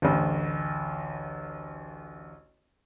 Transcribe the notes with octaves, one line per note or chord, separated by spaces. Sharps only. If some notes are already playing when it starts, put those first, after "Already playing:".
A1 D2